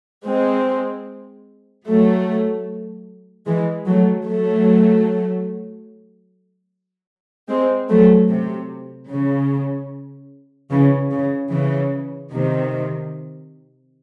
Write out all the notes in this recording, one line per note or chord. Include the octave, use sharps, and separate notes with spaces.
G#3 C4
F#3 A3
E3 G#3
F#3 A3
F#3 A3
G#3 C4
F#3 A3
C3
C#3
C#3 E3
C#3
C#3 E3
C3 D#3